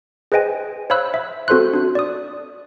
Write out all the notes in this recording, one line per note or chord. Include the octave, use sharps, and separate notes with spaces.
G#4 B4 C5 D#5 G5 G#5
C5 C#5 F5 B5 E6 F#6
E5 E6
C4 F#4 A4 C5 C6 F#6
D4 F#4
D5 D#6